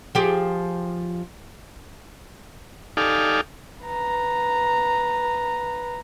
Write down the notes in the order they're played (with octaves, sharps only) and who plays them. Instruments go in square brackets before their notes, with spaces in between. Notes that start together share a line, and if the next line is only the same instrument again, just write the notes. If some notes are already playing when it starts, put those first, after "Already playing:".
[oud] F3 G4 G#4
[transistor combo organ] D#4 G4 A4 D5 F5 G#5
[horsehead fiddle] B4 A#5